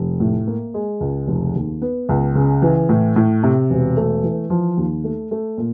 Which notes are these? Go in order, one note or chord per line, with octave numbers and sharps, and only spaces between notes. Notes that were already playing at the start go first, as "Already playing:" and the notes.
Already playing: F1
A2
A#3
G#3
C#2
F1
D#2
B3
C#2
C#3
E3
A2
A2
C3
E1
A3
E3
F3
D#2
A3
A3
A#2